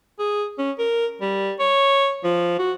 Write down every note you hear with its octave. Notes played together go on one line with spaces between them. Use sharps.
G#4
C#4
A#4
G3
C#5
F3
F#4